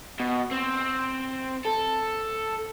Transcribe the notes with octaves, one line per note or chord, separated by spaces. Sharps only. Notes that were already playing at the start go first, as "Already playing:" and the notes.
B2
C4
A4